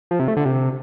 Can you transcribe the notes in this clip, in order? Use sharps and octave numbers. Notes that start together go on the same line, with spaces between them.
F3
C3
A3
D3
C3